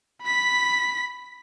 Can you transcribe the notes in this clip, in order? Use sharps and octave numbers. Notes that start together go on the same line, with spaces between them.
B5 B6